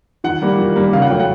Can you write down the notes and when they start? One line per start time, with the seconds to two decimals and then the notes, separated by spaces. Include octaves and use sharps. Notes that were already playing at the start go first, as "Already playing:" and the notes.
0.24 D#3 F#5
0.42 G3 A#3
0.58 D#3
0.76 G3 A#3
0.93 C#3 F5
1.02 F#5
1.10 F#3 A3 C#4 G5
1.19 F#5